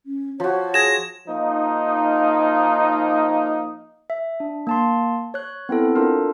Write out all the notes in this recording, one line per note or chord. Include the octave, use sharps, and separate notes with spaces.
C#4
F3 F#4 C#5
G#4 G#6 A#6 E7
F3 A#3 D#4
E5
D4
A#3 A5 C6
C#5 F#6
B3 C4 E4 A4
D4 F4 A4 A#4